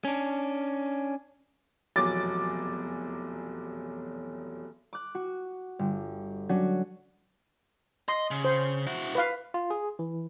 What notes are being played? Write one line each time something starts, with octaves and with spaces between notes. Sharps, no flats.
C#4 D4
F1 E2 B2 F#3 D6 A6
D6 F#6
F#4
G1
F#3 C#4 D4 F#4
D#5 C6
C#3
C5
E4 F#4
B4 F5
F4
G#4
E3